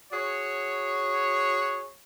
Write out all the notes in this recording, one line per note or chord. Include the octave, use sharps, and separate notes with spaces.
F#4 G#4 C#5